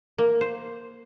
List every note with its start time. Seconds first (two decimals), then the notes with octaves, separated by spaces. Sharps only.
0.18 A#3
0.41 C5